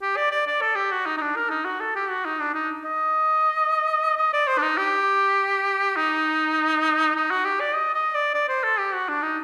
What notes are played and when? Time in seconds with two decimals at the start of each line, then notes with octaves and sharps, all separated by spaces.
0.02 G4
0.17 D5
0.31 D5
0.46 D5
0.62 A4
0.76 G4
0.92 F#4
1.06 D#4
1.17 D#4
1.21 D4
1.36 A#4
1.50 D#4
1.65 F#4
1.80 A4
1.96 G4
2.10 F#4
2.25 D#4
2.40 D4
2.54 D#4
2.85 D#5
4.17 D#5
4.33 D5
4.47 C5
4.58 D4
4.62 D#4
4.77 G4
5.96 D#4
7.15 D#4
7.30 F#4
7.45 G4
7.60 D5
7.74 D#5
7.94 D#5
8.15 D5
8.34 D5
8.48 C5
8.64 A4
8.79 G4
8.94 F#4
9.09 D4
9.23 D#4